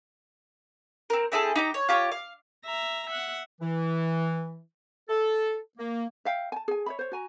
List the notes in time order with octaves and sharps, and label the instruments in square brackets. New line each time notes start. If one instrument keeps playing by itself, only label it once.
[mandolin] C4 A#4
C4 E4 G#4 A4
D#4 G4 A#5
C#5
F4 G4 C#5
F5
[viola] E5 A#5
E5 F#5
[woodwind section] E3
A4
A#3
[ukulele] E5 F5 G5
G#5 A5
G#4 G#5
C#5 E5 B5
C5 C#5
F#4 G#5 A#5